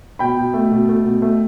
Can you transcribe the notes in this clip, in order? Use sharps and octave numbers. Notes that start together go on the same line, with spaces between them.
B2 G5 B5
B2
A3
B2
A3
B2
A3